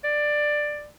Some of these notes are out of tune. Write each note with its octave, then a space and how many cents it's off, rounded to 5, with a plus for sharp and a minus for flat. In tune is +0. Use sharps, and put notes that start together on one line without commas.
D5 +10